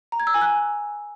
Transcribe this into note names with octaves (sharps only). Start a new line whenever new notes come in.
A#5
G#6
E6
G#5
F#6